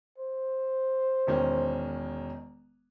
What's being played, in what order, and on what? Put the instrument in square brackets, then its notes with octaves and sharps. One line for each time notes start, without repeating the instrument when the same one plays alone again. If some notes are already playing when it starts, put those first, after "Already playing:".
[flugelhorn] C5
[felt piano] E1 D#3 C#4